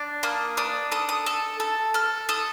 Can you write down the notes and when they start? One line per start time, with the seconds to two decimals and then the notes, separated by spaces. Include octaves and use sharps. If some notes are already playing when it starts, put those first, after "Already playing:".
Already playing: D4
0.23 A#3 D#6
0.57 D4 D#6
0.92 A4 D#6
1.09 D#6
1.26 A4
1.60 A4
1.94 A4 F6
2.29 A4 D#6